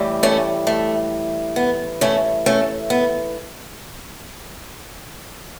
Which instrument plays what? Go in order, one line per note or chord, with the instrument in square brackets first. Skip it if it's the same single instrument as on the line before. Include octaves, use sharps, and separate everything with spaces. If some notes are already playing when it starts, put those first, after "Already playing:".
Already playing: [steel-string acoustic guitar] A2 E3 G3
A3 C#4
A3
B3
A3 C#4
A3 C#4
B3